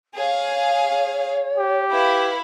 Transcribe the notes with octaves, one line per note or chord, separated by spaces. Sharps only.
G#4 C#5 F5
G4
E4 B4 F5 B5